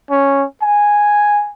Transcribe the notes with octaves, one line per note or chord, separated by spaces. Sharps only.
C#4
G#5